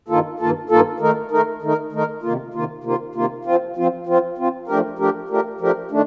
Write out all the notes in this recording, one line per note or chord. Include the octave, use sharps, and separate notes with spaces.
G2 D#3 A#3 F4 A4
G2 D#3 A#3 F4 A4
G2 D#3 A#3 F4 A4
D#3 A3 D#4 A#4
D#3 A3 D#4 A#4
D#3 A3 D#4 A#4
D#3 A3 D#4 A#4
C3 D#3 A#3 F4
C3 D#3 A#3 F4
C3 D#3 A#3 F4
C3 D#3 A#3 F4
F3 C4 F4
F3 C4 F4
F3 C4 F4
F3 C4 F4
F3 A3 D4 G4 A#4
F3 A3 D4 G4 A#4
F3 A3 D4 G4 A#4
F3 A3 D4 G4 A#4
D#3 A3 D4